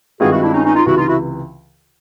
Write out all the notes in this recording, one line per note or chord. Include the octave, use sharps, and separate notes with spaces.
G2 D#3 G#3 C4 F4 F#4 G#4
E4 F#4
D4 E4
C#4 D#4
C#4 D#4
D#4 F4
C#2 C3 E3 E4 F#4
D#4 F4
E4 F#4